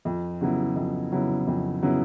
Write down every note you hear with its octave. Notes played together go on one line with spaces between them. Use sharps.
F2
C#3 F#3 B3 E4
F2
C#3 F#3 B3 E4
F2
C#3 F#3 B3 E4